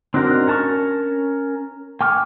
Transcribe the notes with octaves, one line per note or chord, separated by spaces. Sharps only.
C4 D4 D#4 F#4 A#4
C#4 A#4 A5 A#5 C#6
G5 G#5 C#6 D6 F6